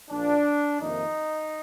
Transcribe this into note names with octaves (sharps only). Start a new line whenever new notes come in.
A#1 A#2 F3 D4
F2 C3 D#3 A#3 D#4